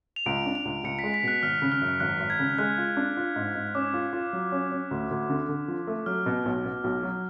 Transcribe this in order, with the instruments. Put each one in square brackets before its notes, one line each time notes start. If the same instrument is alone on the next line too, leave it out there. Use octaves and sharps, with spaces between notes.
[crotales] F7
[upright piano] C#2 [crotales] D7
[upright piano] D4
[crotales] F7
[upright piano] C#2
[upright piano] C#2 [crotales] C#7
[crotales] B6
[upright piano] G#3
[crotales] B6
[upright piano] B2 [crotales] F#6
[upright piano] G#1 [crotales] F6
[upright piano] C#3
[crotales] F6
[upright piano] F#2
[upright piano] G#1 [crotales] F#6
[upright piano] G#1
[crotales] G#6
[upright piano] C#3
[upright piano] G#3 [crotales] F#6
[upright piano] F4
D4
F4
G#2
G#2
[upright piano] C#4 [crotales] D6
[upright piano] F4
F4
F#3
C#4
C#4
D2
D2
D3
D3
F3
A3
[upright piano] F#3 [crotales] F6
[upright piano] B2
B1
B2
B1
F#3